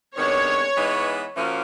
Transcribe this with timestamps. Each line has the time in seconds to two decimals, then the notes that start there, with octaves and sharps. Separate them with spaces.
0.17 C3 D#3 G#3 B3 D4 C#5
0.77 E3 G#3 B3 D#4
1.36 A#2 F3 A#3 C#4 F#4